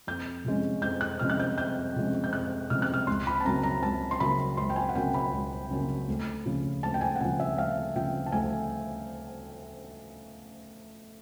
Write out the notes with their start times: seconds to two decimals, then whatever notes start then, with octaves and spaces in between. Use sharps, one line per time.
0.07 F2 G6
0.45 C3 F3 G#3 C#4
0.82 F2 G6
1.01 F#6
1.20 C3 F3 G#3 C#4 F6
1.30 F#6
1.39 G6
1.57 F2 G6
1.96 C3 F3 G#3 C#4
2.24 G6
2.33 F2 F#6
2.70 C3 F3 G#3 C#4 F6
2.82 F#6
2.94 F6
3.07 C#2 C6
3.27 B5
3.40 A5
3.45 C#3 F#3 A#3 C#4 A#5
3.63 A#5
3.82 C#2 A5
4.11 C6
4.20 C#3 F#3 A#3 C#4 B5
4.57 C#2 C6
4.70 G5
4.76 G#5
4.89 F#5
4.95 C#3 F#3 A#3 C#4 G5
5.14 B5
5.33 C#2
5.71 C#3 F#3 A#3 C#4
6.08 D2
6.46 C#3 F3
6.83 D2 A5
6.94 G5
7.01 G#5
7.16 F#5
7.20 C#3 F3 G5
7.40 E5
7.58 D2 F5
7.95 C#3 F3 G5
8.26 A5
8.32 D2 G#5